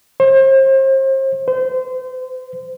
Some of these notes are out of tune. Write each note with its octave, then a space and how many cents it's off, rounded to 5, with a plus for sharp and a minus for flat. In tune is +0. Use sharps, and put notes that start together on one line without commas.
C5 +35
C5 -30